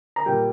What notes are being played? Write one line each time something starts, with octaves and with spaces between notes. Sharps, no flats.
A#5
A#2 G3 G5